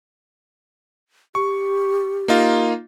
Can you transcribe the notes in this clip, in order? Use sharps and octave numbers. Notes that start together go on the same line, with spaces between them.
G4 C#6
A#3 D#4 F4